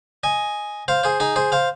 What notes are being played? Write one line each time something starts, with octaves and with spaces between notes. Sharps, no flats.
D#5 G#5
C5 F5
G#4 C5
D#4 G#4
G#4 C5
C5 F5